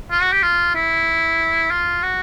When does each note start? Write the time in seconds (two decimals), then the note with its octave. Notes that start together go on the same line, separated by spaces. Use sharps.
0.11 F4
0.22 F#4
0.33 G4
0.42 F4
0.75 E4
1.71 F4
2.03 F#4